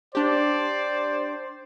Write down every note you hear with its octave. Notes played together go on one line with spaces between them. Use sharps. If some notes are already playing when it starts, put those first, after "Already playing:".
D4 G4 C5 D5